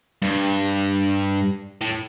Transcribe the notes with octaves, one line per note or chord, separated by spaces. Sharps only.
G2
A2